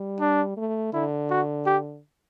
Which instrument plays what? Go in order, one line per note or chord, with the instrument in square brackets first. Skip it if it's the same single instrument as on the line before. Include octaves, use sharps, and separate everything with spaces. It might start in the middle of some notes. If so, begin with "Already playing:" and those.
Already playing: [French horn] G3
[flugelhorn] D4
[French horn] A3
[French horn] D3 [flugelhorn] E4
[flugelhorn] F#4
G4